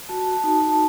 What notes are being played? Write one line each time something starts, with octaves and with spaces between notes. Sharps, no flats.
F#4 A5
F#4
A5
D#4
A5
D#4